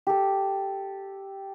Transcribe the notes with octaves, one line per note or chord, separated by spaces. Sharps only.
G4 A4